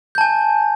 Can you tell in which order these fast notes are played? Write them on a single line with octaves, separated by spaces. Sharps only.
G6 A5 G#5